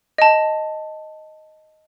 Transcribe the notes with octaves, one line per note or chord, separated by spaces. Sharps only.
D#5 A5